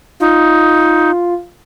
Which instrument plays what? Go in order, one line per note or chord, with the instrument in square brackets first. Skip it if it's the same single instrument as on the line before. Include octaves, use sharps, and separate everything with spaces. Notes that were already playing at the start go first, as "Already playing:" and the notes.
[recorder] D#4 [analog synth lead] F4